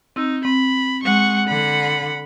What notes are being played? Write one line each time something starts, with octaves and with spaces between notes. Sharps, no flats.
C4 D#4 E6
C4 B5
G#3 F#5 C#6
D3 F#5 B5